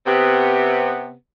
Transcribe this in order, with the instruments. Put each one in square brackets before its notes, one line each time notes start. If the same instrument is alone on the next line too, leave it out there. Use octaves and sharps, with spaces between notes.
[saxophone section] C3 B3